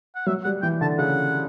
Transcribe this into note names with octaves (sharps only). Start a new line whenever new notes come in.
F#5
F#3 E5
G3 F#5
E3 G5
D3 A5
C#3 F#5